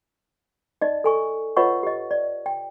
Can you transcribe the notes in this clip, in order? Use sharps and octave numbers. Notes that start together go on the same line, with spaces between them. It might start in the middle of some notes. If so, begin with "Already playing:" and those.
D#4 D5 D#5
A4 G#5 C#6
F4 B4 C#5 D#5 F#5 C#6
G4 D#5
D5
G5